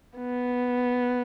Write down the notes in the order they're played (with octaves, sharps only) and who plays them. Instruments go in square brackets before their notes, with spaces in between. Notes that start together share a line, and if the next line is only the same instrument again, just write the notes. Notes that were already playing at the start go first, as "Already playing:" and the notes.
[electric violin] B3